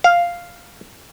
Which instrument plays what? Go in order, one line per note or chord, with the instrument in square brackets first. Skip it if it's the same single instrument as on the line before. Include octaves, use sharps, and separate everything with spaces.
[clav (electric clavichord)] F5